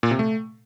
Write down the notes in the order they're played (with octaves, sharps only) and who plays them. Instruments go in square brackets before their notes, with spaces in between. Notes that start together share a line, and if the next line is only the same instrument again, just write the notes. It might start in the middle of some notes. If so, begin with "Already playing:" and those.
[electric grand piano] A#2
C3
A3